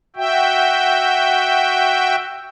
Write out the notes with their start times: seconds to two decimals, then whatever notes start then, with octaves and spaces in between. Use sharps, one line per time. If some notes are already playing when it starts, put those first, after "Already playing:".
0.16 F#4 E5 G5